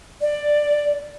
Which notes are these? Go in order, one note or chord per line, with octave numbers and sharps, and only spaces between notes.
D5